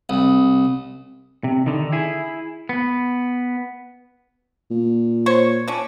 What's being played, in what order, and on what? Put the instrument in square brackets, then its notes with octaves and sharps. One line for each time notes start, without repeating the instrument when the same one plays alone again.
[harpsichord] C2
[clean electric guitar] C3
D3 D#3
E4 G#4
B3
[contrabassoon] A#2
[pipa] C5 C#5
C#4 D4